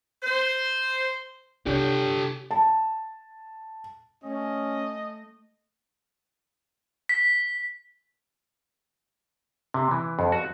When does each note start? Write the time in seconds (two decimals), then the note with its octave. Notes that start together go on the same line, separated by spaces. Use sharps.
0.21 C5
1.67 C3 D4 G4 A4 C#5 G6
2.51 A5
4.24 A3 C#4 D#5
7.09 B6
9.74 C3
9.91 E3
10.19 F2
10.32 F#4